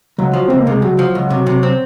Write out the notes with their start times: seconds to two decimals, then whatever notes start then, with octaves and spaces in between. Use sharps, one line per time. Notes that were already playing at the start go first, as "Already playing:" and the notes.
0.18 C#2 F#3
0.34 F3
0.48 C#2 C4
0.60 A#3
0.67 C3 G#3
0.82 C#2 F#3
0.99 F3
1.15 C#2
1.30 C3
1.47 C3
1.63 C4